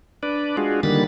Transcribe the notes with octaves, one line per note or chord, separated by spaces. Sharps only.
D4 B4 D5
G#3 D4 F4 F#4 G#4
D3 D#3 G3 A#3 B5 A6